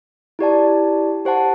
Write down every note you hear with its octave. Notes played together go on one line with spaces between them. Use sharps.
E4 G4 D5 A5
G4 C5 F#5 A5